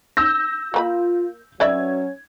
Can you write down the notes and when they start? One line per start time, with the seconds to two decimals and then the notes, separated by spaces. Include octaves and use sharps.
0.17 E6 G6 A#6
0.74 A#3 F4 B4 B5
1.60 F#3 C#4 B4 D5 E5 G#6